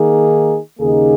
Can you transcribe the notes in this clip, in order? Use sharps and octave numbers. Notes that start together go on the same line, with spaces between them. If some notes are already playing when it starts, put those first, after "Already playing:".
Already playing: D#3 A#3 D#4 G#4
D#2 C#3 A#3 D#4 G#4